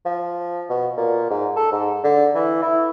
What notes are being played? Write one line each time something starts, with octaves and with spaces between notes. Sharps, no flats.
F3
B2
A#2
G#2
A4
G#2
D3
E3
E4